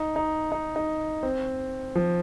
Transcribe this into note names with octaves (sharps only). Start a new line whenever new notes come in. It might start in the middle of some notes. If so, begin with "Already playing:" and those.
Already playing: D#4
D#4
D#4
D#4
C4
F3